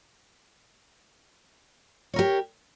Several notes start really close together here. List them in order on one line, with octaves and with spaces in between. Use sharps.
C#5 A#4 G4